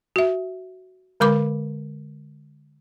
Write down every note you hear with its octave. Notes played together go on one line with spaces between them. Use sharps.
F#4 E5
D3 G#3 A#4 B5 D6